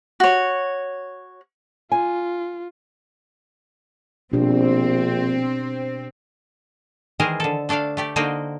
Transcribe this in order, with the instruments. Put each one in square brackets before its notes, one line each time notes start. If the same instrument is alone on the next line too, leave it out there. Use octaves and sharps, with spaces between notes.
[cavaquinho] F#4 C#5
[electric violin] F4 [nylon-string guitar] G#5
[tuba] A#1 [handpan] B2 D4 G4 [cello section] C4
[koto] D#3 E3 G#3 G#4 A#4 C5
D3 A4
A3 D4 A4 D5 F5
A3 G4 D5
D3 A#3 D#4 F#4 C5 G5